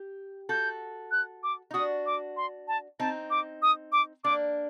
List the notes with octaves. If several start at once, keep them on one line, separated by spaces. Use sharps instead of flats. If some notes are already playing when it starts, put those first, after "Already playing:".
Already playing: G4
F#4 A4 G6
F#6
D6
D#4
D4 F#4 D#6
D6
C6
A5
C4 D#4 A5
D6
D#6
D6
A#3 D4 D6